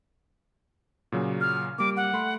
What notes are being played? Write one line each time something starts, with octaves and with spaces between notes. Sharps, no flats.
A#2 C#3 F#3
F6
G3 A#3 D6
F#5
A3 B5 C6